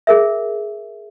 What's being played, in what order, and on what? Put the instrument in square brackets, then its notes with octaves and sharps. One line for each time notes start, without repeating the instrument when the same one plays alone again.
[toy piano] G#4 A#4 E5